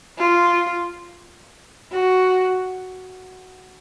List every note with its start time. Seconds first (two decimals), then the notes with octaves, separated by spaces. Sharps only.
0.19 F4
1.92 F#4